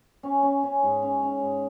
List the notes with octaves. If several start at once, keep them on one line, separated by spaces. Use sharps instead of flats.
C#4
C#4
C#4
G#2
C#4
C#4
G#2